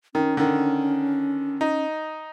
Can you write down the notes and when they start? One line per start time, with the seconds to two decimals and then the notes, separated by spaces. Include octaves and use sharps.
0.15 D#3 C#4
0.37 D3 D#3
1.61 D#4